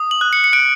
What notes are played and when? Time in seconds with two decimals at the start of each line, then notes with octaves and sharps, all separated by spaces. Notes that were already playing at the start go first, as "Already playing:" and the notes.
Already playing: D#6
0.11 F#7
0.21 F#6
0.33 C#7
0.44 C#7
0.53 F#6 D7